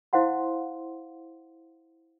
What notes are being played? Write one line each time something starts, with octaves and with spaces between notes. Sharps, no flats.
E4 C5 F5 F#5 C6